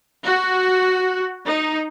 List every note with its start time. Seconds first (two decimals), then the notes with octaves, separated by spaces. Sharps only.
0.24 F#4
1.46 D#4